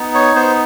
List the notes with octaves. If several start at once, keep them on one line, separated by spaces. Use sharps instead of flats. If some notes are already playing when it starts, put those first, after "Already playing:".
Already playing: B3 D#4
C#5
B3 C5